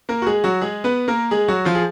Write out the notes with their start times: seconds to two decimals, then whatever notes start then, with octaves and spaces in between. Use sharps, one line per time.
0.09 A#3 A#4
0.22 F#4
0.27 G#3 G#4
0.44 F#3 F#4
0.61 G#3 G#4
0.84 B3 B4
1.08 A#3 A#4
1.31 G#3 G#4
1.48 F#3 F#4
1.65 F3 F4
1.75 G#4